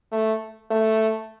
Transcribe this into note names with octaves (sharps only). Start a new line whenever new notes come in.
A3
A3